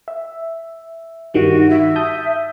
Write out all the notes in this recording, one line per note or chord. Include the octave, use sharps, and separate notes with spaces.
E5
G2 D#3 G3 F#4
E5
A5 D#6 G6